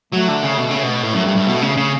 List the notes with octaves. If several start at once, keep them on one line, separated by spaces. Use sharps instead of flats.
F#3 A3
D3
C#3
B2
C#3
B2
A2 A3
F#2
G2
G2
B2
C#3
C#3